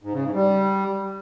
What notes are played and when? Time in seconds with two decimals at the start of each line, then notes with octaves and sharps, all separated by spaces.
0.03 G#2
0.14 C#3
0.24 G#2
0.34 G3